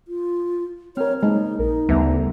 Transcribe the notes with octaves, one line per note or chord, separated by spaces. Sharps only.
F4
C4 A#4 C#5 F6
G#3 A#3 D#4
A#1 D#4 A#4
D2 C#3 G3 B3 E5 A#5